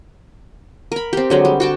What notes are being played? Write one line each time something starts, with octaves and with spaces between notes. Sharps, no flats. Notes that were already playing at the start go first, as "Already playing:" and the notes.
A#4 B5
C4 G4
D3 F#3 G#3
G3
F#4 G5 A5